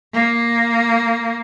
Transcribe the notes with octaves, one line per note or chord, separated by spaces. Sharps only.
A#3